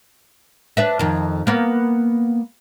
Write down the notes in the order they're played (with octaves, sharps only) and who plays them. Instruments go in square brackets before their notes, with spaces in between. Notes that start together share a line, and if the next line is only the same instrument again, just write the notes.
[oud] D4 B4 E5
F2 D#3
A#3 B3